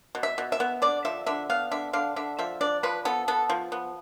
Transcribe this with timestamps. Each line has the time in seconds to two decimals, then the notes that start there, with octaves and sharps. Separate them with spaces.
0.15 B2
0.23 E5
0.38 B2
0.52 E5
0.60 B3
0.82 D3 D5
1.05 F3 E5
1.26 D3 E5
1.50 B3 F5
1.71 D3 E5
1.93 D3 F5
2.16 D3 E5
2.39 F3 E5
2.61 D4 D5
2.83 F3 B4
3.05 B3 A4
3.28 B3 A4
3.50 F3
3.72 B3